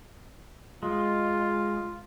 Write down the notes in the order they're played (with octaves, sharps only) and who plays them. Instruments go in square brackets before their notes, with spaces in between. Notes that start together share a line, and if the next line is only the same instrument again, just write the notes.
[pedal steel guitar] G#3 [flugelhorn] F4